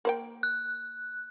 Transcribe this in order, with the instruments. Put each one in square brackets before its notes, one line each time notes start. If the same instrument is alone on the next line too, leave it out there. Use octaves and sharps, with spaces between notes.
[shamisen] A#3 C5 G5
[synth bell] F#6